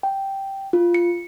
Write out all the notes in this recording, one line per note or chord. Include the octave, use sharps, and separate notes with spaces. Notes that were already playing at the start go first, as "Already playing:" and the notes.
G5
F4
C#7